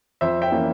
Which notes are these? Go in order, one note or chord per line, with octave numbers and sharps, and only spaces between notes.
F2 C5 E5
E5 G5
E3 A#3 C#4